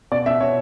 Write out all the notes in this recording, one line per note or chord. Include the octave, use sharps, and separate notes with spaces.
B2 D5
B2 E5
B2 C#5